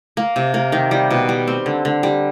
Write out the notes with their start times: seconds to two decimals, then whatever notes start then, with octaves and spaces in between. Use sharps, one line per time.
0.17 A#3
0.36 C3
0.54 A#3
0.72 D#3
0.91 G3
1.10 B2
1.29 G3
1.47 C4
1.66 D3
1.85 D3
2.03 G3